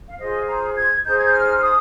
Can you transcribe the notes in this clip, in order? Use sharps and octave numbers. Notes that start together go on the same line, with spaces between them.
F5
F4 G#4 C5 D#5
A#5
G#6
D#4 G#4 C5 G6
G#6
G6
F6
F6
D#6